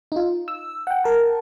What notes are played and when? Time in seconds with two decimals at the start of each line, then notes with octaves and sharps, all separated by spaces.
0.12 D#4 F4
0.48 E6
0.87 F#5 G5
1.04 A#4 A5